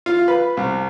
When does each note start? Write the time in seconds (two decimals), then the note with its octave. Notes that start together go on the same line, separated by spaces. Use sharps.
0.06 F4
0.28 B4
0.57 C2